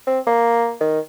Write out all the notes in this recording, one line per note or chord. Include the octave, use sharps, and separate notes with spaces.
C4
A#3
D#3